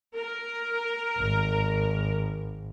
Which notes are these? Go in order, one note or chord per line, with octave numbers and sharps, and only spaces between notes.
A#4
G#1